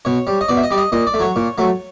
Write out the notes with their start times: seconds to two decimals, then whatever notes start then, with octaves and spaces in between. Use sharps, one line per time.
0.05 B2 C#5
0.27 G3
0.41 D#5
0.48 B2 D5
0.57 E5
0.63 D#5
0.71 G3 D5
0.78 D#5
0.92 A#2 D#5
1.07 D5
1.14 A3
1.19 F#3 C#5
1.36 A#2
1.58 F#3 A3